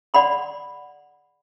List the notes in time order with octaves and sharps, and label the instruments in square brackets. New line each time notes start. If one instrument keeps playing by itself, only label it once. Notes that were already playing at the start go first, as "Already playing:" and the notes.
[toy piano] D5 F#5 B5 C6